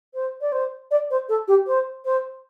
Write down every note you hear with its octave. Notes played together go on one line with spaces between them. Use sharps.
C5
D5
C5
D5
C5
A4
G4
C5
C5